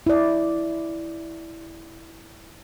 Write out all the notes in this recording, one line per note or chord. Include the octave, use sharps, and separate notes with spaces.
E4 D5